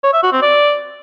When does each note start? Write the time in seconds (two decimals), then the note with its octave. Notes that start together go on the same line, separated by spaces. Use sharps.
0.04 C#5
0.13 E5
0.23 F#4
0.32 C4
0.42 D5